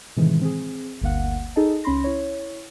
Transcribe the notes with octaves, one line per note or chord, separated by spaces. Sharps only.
A2 C3 D#3 E3 G#3
C4 G#4
G1 D2 A#3 F5 F#5
D#4 G#4 A4 D#5 A5
C#2 C#4 B5 C6 A#6
E4 C#5